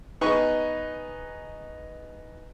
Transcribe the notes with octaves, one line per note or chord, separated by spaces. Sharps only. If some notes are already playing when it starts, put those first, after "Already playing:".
B3 D#4 G#4 B4 C#6